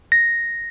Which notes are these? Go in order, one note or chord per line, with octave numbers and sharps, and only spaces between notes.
A#6